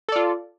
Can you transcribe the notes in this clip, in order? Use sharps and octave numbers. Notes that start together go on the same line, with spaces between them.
F4 A4 D5